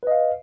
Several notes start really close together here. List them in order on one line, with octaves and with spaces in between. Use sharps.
B4 D#5 F5